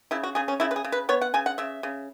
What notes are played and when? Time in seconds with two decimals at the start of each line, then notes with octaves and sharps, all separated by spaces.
0.11 C#3 E4
0.23 F#4
0.35 C#3 G#4
0.48 C#4
0.60 C#3 E4
0.71 B4
0.76 G#4
0.84 C#3
0.92 B4
1.09 B3 C#5
1.21 F#5
1.34 C#3 G#5
1.46 F#5
1.58 C#3 E5
1.83 C#3